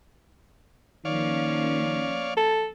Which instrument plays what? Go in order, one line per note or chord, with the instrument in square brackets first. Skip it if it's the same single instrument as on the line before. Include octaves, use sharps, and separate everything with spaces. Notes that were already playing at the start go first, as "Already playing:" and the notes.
[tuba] D#3 [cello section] F3 A#3 C#4 [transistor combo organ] C#5 D5 F5
[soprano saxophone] A4